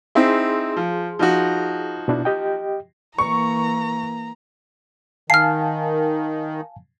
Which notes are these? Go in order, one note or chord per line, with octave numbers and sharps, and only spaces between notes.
C4 D#4 E4 G#4 C6
F3
F3 D#4 F#4
B2 D4 E4
G4 D#5 G5
E3 A#3 A#5 C#6
D#3 F5 G#5 A5 F6 C7